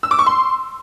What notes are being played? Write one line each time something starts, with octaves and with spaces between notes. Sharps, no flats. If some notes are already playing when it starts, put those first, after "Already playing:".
E6
D6
C#6
C6